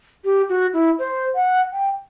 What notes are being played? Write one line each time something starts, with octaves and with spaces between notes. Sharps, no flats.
G4
F#4
E4
C5
F#5
G5